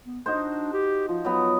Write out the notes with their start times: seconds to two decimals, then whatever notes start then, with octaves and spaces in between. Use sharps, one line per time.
0.05 B3
0.26 D4 D#4 F#4 C5
0.73 G4
1.09 F3 F4
1.25 F#3 B3